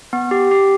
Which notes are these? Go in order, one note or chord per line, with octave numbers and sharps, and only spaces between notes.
B3
G4
G4